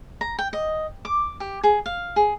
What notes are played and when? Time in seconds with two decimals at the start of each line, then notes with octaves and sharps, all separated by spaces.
0.21 A#5
0.39 G5
0.53 D#5
1.05 D6
1.40 G4
1.64 G#4
1.86 F5
2.16 G#4